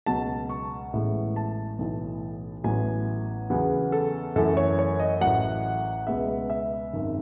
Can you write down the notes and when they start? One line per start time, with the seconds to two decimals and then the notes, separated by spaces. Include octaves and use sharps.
0.06 C#2 B2 F#3 A5
0.50 C#6
0.93 A1 A2 G#3 B3
1.36 A5
1.79 B1 A2 E3
2.64 A1 A2 F#3 B3 G#5
3.50 E2 C#3 F#3 B3
3.92 A4
4.36 F#2 E3 A3 A4
4.57 C#5
4.79 C#5
5.00 D#5
5.21 A1 A2 F#3 F#5
6.07 C#2 B2 G#3 B3 E5
6.50 E5
6.93 G#1 F#2 D#3